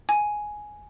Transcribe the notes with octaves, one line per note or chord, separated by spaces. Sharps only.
G#5